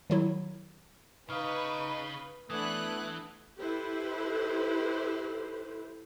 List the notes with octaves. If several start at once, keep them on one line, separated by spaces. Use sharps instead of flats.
D#3 F#3 E4
C#3 D#4 B4 F5 D#6 F6
E3 A3 B3 D4 D#6 F#6 G#6
E4 G4 A4 B4 C5